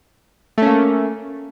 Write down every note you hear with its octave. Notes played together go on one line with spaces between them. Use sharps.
A3 A#3 C#4